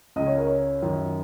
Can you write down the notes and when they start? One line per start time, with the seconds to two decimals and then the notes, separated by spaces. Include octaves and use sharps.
0.16 C#2 C#3 D#5
0.26 C#5
0.37 A#4
0.47 C#5
0.82 F#2 D#3